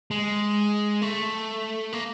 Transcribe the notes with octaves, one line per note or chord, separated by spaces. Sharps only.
G#3
A3
A#3